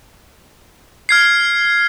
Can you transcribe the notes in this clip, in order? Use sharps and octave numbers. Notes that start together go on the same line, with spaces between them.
F6 G#6 C7